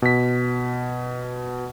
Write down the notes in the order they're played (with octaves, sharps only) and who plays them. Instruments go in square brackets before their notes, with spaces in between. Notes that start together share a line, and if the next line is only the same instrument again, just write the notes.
[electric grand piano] B2 B6